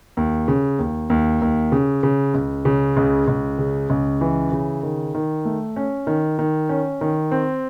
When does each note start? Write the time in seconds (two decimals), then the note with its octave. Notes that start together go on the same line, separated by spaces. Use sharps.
0.17 D#2
0.48 C#3
0.79 D#2
1.10 D#2
1.42 D#2
1.72 C#3
2.03 C#3
2.34 C#2
2.65 C#3
2.97 C#2
3.28 C#2
3.58 C#3
3.90 C#2
4.21 E3
4.52 C#3
4.83 D#3
5.14 D#3
5.45 A3
5.76 C#4
6.07 D#3
6.39 D#3
6.69 C#4
7.01 D#3
7.32 C4